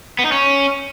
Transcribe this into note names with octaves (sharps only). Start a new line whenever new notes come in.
B3
D#4
C#4